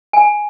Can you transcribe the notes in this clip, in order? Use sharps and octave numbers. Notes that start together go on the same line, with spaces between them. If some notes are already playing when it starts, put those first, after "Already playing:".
G#5